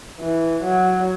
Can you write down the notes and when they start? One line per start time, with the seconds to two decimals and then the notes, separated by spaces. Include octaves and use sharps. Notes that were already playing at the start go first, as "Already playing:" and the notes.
0.20 E3
0.64 F#3